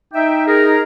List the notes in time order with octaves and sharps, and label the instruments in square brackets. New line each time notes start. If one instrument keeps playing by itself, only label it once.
[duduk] D#4 [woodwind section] E5 G5
[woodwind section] G#4 A#4